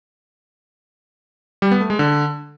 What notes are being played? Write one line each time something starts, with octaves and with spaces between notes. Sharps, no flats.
G3
B3
A3
G#3
D3